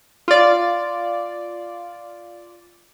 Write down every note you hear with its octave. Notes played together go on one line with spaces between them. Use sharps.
F4 D5